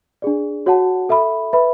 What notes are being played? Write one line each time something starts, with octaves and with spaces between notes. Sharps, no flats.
D4 G#4 D5
F#4 C#5 F#5 A5
A4 E5 B5
B4 E5 B5